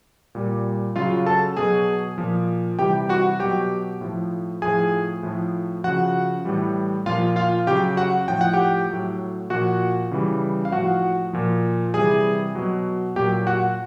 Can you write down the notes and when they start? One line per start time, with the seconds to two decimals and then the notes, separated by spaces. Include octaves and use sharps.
0.35 A#2 G3
0.96 C#3 F#3 F4 F5
1.26 A4 A5
1.57 B2 F#3 G#4 G#5
2.18 A#2 F3
2.79 C3 E3 G3 G4 G5
3.09 F#4 F#5
3.40 B2 F#3 G4 G5
4.01 A2 F3
4.62 A2 F3 G#4 G#5
5.23 A2 F3
5.84 C#3 F3 F#4 F#5
6.45 A2 E3 G3
7.06 A#2 F3 F4 F5
7.36 F4 F5
7.67 C#3 F#3 G4 G5
7.97 F#4 F#5
8.28 A2 F3 G5
8.41 F#5
8.54 G4 G5
8.89 A2 F#3
9.50 A#2 F3 F#4 F#5
10.11 C#3 E3 G3
10.65 F5
10.72 A2 F3 F#4 F#5
11.33 A#2 F3
11.94 C3 E3 G3 G#4 G#5
12.55 B2 F#3
13.16 A#2 F#3 G4 G5
13.47 F#4 F#5